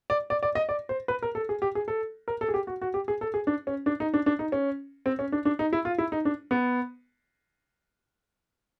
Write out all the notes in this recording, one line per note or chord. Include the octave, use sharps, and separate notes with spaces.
D5
D5
D5
D#5
D5
C5
B4
A#4
A4
G#4
G4
G#4
A4
A#4
A4
G#4
G4
F#4
F#4
G4
G#4
A4
G#4
D4
C#4
D4
D#4
D4
D4
D#4
C#4
C4
C#4
D4
D4
D#4
E4
F4
E4
D#4
D4
B3